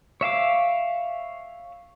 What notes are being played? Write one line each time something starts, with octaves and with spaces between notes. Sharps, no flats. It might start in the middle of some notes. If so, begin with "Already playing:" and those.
C#5 E5 F5 D6